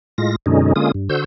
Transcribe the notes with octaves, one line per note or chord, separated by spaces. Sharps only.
A2 G#3 F4 A#6
F#2 B2 D3 G#3 C#4 D#4
D3 G#3 A#3 C#4 F4 D#6
G2
D3 F#4 C5 E6 G6